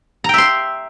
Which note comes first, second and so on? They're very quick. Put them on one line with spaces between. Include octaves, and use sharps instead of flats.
A#5 G5 E5 C6